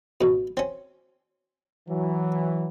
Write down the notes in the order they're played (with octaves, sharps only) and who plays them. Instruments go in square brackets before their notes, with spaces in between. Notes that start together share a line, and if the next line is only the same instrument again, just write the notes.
[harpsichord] A1 B2
C4 C#4
[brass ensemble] E3 F#3